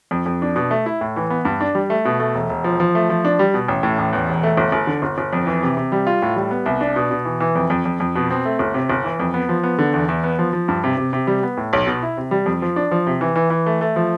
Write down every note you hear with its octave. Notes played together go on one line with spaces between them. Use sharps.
F2
F2
D4
B2
A3
E4
A2
E3
B3
G2
D4
G3
A3
B2
A3
E1
E1
F3
F3
A3
F3
D4
G3
B2
A1
A2
A1
E2
E1
A3
G1
G1
D3
G1
G1
F2
E3
C3
C3
G3
F4
A2
G3
B3
C2
D4
B2
B2
E3
E3
F2
F2
F2
F2
B2
C4
A3
G1
C3
G1
E3
F2
B3
F3
B3
D3
E2
E2
B3
F3
F3
G2
C3
C3
C3
G3
B3
A2
B1
B2
E4
C3
G3
F2
F3
D4
F3
C3
E3
E3
E3
A3
A3
F3